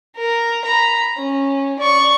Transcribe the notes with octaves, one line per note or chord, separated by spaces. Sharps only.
A#4
A#5 B5
C#4
D5 C#6